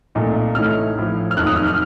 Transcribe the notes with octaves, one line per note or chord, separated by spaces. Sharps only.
C2 A#2 A3 D#4
A1 A2 A3 D#4 F6
A1 A2 F3
F6
F1 D#2 D#3 F#3 F#6
D#6
F6
F6